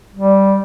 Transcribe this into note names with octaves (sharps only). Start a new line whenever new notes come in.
G3